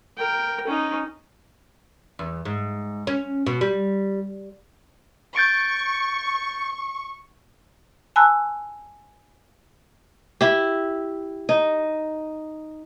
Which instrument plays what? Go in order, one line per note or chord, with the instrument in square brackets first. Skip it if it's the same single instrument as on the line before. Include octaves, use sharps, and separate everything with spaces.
[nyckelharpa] A#4 G5
C#4 D#4
[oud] E2
G#2
C#4
B2
G3
[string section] C#6 [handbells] G6 A6 D7
[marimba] G#5 A5 B5 E6 F#6
[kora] E4 G4
D#4